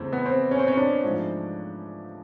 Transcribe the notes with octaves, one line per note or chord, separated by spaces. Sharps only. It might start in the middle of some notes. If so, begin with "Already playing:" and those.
Already playing: E2 C#3 E3 A3 C4
B3
C4
C#4
C4
C#4
D4
G#2 F3 A3